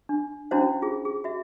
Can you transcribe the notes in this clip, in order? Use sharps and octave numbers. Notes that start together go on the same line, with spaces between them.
D4
C#4 D4 E4 F#4 C5 F5
F4 G#4
G#4
F#4 E5